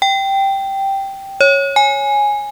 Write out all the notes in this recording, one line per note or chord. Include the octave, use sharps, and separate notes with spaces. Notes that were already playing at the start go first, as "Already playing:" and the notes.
G5
C#5
G#5